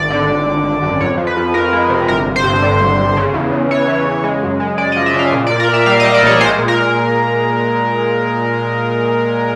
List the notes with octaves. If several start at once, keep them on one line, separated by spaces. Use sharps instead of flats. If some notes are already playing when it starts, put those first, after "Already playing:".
Already playing: G#1 D5
D3
G#1
G#1
G#1
F#2
F2 C#5
F3
B4
F2
F2 A#4
G#3
C3
G1 A#4
G1
C5
G2
D3
G1
G1
C#3
E2
E2
E3 C#5
E3
C#3
G#3
F#2
G#3
G#3 D5
D#5
F3
E5
C#3 F5
A#2
D5
A#2
A#4
A#2
E5
G3 F5
D#5
G3
D5
A#1 C#5
G#3 C5
A#2
A#4